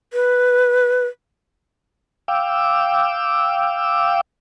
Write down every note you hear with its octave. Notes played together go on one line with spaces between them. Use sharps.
B4
F5 G5 D6 E6